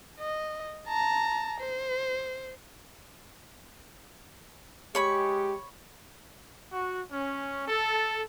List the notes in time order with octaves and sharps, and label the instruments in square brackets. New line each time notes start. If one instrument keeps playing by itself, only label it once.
[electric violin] D#5
A5 A#5
C5
[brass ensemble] G#3 G4 [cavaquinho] C#5 B5 C#6
[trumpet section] F#4
C#4
A4